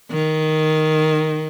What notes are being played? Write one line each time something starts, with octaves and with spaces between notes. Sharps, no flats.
D#3